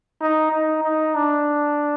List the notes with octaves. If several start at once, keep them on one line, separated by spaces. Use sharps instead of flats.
D#4
D#4
D#4
D4